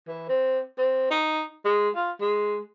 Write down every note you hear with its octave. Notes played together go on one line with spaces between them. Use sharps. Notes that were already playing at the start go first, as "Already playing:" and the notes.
E3
C4
C4
D#4
G#3
F4
G#3